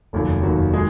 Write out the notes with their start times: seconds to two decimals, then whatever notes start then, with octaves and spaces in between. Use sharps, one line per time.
0.13 F1 D#2 D#3 F#3
0.43 F1 D#2 D#3 F#3 F#4
0.73 D#3 G#3 G#4